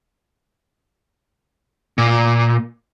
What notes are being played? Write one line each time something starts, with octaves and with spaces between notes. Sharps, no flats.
A#2